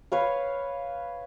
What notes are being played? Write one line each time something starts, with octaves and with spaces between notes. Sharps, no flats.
B4 C#5 F5